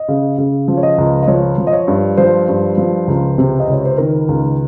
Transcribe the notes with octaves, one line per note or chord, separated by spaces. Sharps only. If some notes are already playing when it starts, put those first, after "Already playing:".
Already playing: D#5
C#3
C#3
F3
C#5
D#5
C#2
D#5
F3 C#5
F3
D#5
C#5
G2
F3 C5
G2
F3
C#2
C3
D#5
C#2 C#5
C5
D#3 A#4
C#2